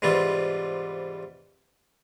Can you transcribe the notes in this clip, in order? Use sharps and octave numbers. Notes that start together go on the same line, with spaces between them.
G#2 C3 E3 G3 F4